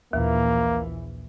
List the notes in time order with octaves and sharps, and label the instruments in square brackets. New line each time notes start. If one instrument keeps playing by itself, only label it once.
[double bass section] A#1 E3 [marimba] D#2 [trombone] A#3